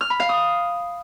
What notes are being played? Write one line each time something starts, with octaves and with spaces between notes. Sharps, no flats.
F6
B5
F5
D#6